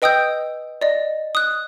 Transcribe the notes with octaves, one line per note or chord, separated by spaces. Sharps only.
B4 D#5 G5 D#6 E6 G6
D5 D#5
D#6 F#6